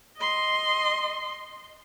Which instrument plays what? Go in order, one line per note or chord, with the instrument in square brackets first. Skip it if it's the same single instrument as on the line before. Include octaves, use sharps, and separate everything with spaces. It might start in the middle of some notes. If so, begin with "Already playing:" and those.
[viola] D#5 C6